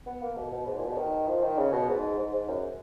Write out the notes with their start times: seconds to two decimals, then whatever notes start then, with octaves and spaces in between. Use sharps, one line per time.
0.06 B3
0.22 A#3
0.37 B2
0.52 B2
0.67 G#2
0.77 A#2
0.87 B2
0.97 D#3
1.27 F3
1.43 D#3
1.58 C#3
1.72 B2
1.88 G#2
2.18 G#2
2.33 G#2
2.48 F#2